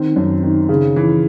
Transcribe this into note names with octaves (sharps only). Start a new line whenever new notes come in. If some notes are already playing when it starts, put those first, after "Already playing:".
Already playing: D#3 C4
F#2
D#3
C#3
E3